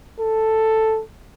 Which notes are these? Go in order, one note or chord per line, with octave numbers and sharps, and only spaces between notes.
A4